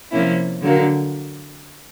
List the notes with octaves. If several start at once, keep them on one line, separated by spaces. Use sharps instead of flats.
C3 F3 A#3 C#4 E4
D3 F#3 A#3